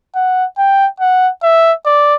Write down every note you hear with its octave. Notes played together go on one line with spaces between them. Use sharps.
F#5
G5
F#5
E5
D5